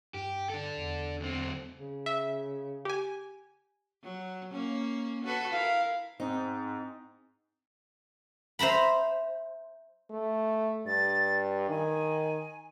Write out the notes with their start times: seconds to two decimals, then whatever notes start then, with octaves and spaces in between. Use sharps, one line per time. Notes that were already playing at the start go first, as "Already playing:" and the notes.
0.14 G2 G4
0.50 D4 A4
0.78 E2
1.20 D2 C4
1.72 C#3
2.06 E5
2.85 G4 G#5
4.03 F#3
4.51 A#3 C#4
5.24 F#4 A4 B4
5.53 E4 A#4 F5
6.20 G#2 C4 D#4
8.59 C5 E5 A#5 B5
10.11 A3
10.86 G2 A6
11.69 D#3 G#5